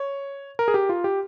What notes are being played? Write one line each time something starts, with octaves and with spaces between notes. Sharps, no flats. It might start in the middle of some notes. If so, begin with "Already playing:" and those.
Already playing: C#5
A#4
G#4
G4
F4
G4